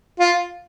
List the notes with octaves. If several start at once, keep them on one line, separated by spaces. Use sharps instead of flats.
F4